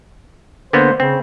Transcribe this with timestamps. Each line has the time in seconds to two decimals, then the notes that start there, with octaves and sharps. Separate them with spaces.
0.73 D3 A#3 B3 C5
1.00 C#3 C4